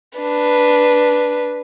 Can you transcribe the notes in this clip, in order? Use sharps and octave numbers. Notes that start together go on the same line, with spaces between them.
D4 B4